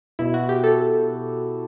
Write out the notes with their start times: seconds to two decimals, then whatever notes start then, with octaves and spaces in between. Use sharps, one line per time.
0.19 B2 E4
0.34 F#4
0.49 G4
0.64 A4